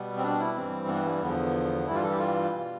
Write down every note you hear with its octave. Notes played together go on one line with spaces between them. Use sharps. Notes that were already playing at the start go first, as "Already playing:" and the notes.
Already playing: B2 G3 B3
C4
D4
E4
G2 E3 G3 C4
B3
G3
E2 D3 F3 B3
G2 E3 G3 E4
F4
A4
G4
F4
B2 G3